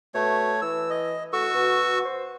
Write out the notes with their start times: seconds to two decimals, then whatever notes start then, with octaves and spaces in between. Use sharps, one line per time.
0.14 B2 A3 C#5
0.62 E3 E6
0.90 D#5
1.33 A3 F#4 C#6 E6
1.55 B2
2.05 C5